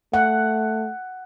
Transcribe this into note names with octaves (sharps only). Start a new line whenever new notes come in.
A3 F#5